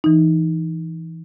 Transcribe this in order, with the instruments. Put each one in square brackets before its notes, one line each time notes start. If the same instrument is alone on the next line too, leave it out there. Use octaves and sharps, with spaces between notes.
[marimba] E3 D#4